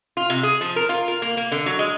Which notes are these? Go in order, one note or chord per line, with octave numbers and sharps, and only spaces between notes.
F4
C3
G#4
F3
A#4
F4
A#4
A#3
A#3
D3
F#3
G#3